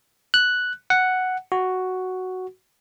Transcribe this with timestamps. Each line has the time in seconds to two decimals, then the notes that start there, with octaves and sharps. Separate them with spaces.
0.34 F#6
0.90 F#5
1.52 F#4